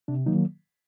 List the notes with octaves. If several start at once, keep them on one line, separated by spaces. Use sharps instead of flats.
C3 D4
D#3 F#3 A#3 D#4